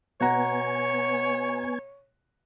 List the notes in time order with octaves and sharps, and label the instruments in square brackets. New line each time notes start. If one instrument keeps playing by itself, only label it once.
[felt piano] B2 F#5 A#5 [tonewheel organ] B3 G#5 [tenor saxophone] C#5